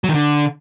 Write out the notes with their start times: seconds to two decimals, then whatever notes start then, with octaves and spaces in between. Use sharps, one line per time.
0.04 F#3
0.09 D#3
0.14 D3